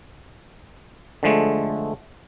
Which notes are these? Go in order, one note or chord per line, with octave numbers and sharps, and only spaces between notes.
D3 F3 G#3 A3